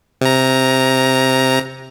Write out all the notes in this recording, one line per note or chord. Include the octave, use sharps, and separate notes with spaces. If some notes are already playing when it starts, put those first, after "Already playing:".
C3 A#5